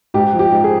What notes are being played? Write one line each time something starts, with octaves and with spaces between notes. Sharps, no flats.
G#2 G4
F3
G4
G#2
G#4